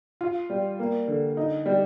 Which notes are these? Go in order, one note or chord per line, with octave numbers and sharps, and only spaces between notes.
F4
G3
A#3
D3
D#4
G3